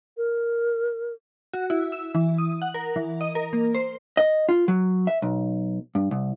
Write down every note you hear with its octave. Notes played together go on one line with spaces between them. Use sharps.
A#4
F#4
E4
E6
E3
D#6
F#5
A#4
E3
D#5
A#4
A#3
C5
D#5
F4
F#3
E5
B1
G2
C2